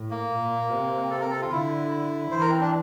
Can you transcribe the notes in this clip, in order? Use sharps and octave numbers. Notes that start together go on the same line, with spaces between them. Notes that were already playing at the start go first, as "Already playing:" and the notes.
Already playing: A2
A#3
A#2
C3
A4
A#4
A4
F4
D3 E4
E3 C5
A#4
C4
D4